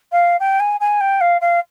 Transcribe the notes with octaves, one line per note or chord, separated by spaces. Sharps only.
F5
G5
G#5
G#5
G5
F5
F5